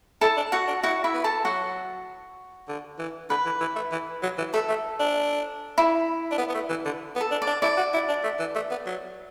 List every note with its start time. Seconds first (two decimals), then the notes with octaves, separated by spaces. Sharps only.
0.21 E4 A4 A5
0.37 D4
0.52 F#4 F#5
0.68 D4
0.83 E4 F#4 F#5
1.04 E4 E5
1.14 B3
1.24 A4 A5
1.44 F#3 F#4 F#5
2.68 D3
2.99 E3
3.30 D3 B4
3.46 E3
3.61 E3
3.76 A3
3.92 E3
4.23 F#3
4.38 E3
4.54 A3 A4
4.69 A3
5.00 D4
5.78 E4
6.31 D4
6.38 B3
6.49 B3
6.54 A3
6.70 E3
6.85 D3
7.16 B3
7.21 A4
7.32 D4
7.42 D5
7.47 D4
7.62 E4 D5
7.78 F#4
7.93 E4
8.09 D4
8.24 A3
8.39 E3
8.55 A3
8.71 B3
8.86 F#3